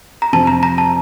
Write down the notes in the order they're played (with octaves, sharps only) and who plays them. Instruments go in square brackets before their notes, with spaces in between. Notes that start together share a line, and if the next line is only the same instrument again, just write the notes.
[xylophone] A#5
[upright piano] F2 C3 F3 [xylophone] A5
[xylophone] A#5
A#5
A5